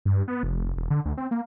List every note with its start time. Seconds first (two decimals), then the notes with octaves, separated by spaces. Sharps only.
0.05 G2
0.28 B3
0.43 F1
0.65 F1
0.77 E1
0.90 D3
1.05 D2
1.17 C4
1.31 A#3